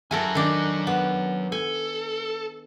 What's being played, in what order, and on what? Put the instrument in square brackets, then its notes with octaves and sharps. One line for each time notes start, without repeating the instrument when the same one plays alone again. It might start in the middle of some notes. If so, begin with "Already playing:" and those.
[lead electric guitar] F#3 G#5 [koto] E4 A4 A#4
[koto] D#3 D4
B3
[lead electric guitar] A4 [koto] G#5